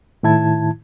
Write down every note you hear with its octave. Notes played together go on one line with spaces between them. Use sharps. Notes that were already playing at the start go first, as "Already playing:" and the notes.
A2 D#3 E4 A5 G#6